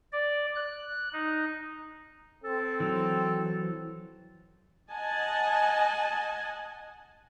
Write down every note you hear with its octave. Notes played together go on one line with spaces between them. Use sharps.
D5
F#6
D#4
C4 A4
E3 F#3
D#5 F#5 G#5 A5